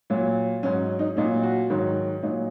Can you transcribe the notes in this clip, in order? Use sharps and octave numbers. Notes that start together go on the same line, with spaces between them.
A#2 F#3
G#2 F#3 C#4
D#4
A#2 F#3 D#4
F#4
G#2 D#3 F#3
A#2 F#3 D#4